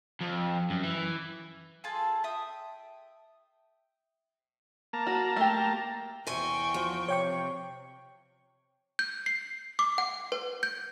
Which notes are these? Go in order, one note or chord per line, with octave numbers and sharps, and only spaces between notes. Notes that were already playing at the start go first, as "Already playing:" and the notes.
F2
F#2
E3
F4 G#4 A4 A5
E5 G5 D#6
A#3 A5 A#5
F#4
A3 G4
E2 C3 G5 G#5 C#6
F3
C3 C#5 G5 C#6
G6
C7
D6
F#5
B4
G6